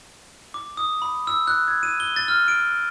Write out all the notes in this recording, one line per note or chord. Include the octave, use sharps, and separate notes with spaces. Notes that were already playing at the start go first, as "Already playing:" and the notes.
D6
D#6
B5
E6
F#6
G#6
D#7
G7
A6
F6
D7